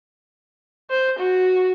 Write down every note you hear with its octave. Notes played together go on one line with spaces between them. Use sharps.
C5
F#4